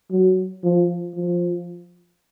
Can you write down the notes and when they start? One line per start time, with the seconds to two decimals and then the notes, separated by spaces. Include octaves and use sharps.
0.11 F#3
0.64 F3
1.16 F3